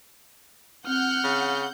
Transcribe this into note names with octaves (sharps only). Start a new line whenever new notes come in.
C4 F#5 F6 G6
C#3